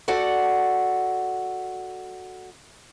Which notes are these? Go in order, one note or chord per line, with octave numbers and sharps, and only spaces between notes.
F#4 A4 D5 F#5